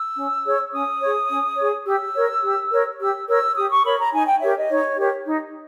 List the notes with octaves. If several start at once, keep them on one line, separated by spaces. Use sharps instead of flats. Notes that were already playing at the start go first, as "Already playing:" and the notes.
Already playing: E6
C#4
G#4 C#5
C#4 D#6
G#4 C#5
C#4
G#4 C#5
G4 E6
A#4 C#5
G4
A#4 C#5
G4 E6
A#4 C#5 E6
G4 D#6
C#6
A#4 C#5 B5
A#5
D#4 G#5
G5
G4 A#4 C#5 E5
D#5
D#4 C#5
G4 A#4 C#5
D#4